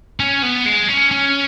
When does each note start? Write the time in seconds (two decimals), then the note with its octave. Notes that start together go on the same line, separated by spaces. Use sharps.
0.20 C#4
0.43 B3
0.66 G#3
0.88 C#4
1.11 C#4